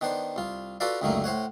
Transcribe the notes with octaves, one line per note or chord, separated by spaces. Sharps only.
D#3 B3 D4 C5
C2 F4
F4 F#4 A4 B4 D5 F5
C#2 F#2 D3 D#3 A3 A#3
A2 C5 C#5 F#5